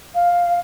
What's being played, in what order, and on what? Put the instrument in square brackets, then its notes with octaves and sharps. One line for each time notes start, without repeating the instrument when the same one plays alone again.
[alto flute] F5